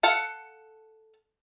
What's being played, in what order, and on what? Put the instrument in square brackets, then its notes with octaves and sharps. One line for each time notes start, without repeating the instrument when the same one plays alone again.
[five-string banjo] A4 F5 F#5